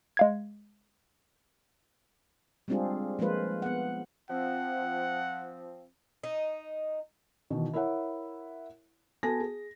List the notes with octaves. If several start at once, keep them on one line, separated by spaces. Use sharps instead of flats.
G#3 F5 G#6
G3 G#3 C4 D4 F4 G#4
F3 G#3 A#3 F4 B4 C5
B3 F#5
F3 C4 F#5
D#4
B2 D#3 E3
E4 A#4 C#5 E5 F#5
B3 F#4 A4 G#5 A5 A#6
G#4